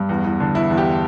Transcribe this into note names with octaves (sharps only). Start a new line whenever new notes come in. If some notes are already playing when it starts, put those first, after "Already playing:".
Already playing: G2
E2
E2
D3
E2 E4
E2
G4